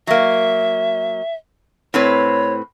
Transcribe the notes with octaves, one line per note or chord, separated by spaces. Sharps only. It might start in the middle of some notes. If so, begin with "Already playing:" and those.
F#3 A#3 E5
A2 C4 B4 C#5